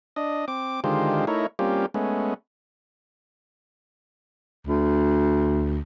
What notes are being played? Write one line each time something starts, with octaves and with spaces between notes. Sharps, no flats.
D4 D#5
C4 D6
D3 D#3 G#3 F4 G4 C5
A3 D#4 E4 A#4 C#5
G3 A#3 C4 C#4 F4 G4
G#3 A3 B3 C#4
D2